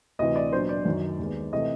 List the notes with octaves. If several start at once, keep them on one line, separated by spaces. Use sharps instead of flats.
D2 C3 E3 D#5
D5
A#2 F#3 B3 D4 C5
D5
F#2 D#3 F#3
D#2 D#3 G#3 B3
C3 E3 A3 D#5